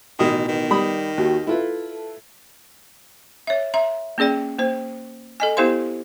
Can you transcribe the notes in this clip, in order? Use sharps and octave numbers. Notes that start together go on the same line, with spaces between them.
A1 B2 D#3 D#6
D#3 B3
G3 B5 D#6
D#2 F#4
E4 F4 A4 B4
C#5 E5
E5 A#5 C6
A#3 C#4 G#4 D5 G5
A#3 C5
A4 D#5 G#5
B3 E4 G4 C5 F5 C6